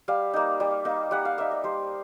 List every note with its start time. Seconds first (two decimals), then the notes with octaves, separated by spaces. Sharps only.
0.08 G3 F5
0.34 A#3 D#4
0.60 G3
0.85 A#3 D#4
1.11 G3 F#5
1.25 F5
1.38 A#3 D#4 E5
1.51 D#5
1.64 G3 C5